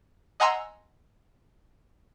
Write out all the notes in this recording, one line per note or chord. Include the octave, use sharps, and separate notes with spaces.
D#5 F#5 G#5 A#5 C6 E6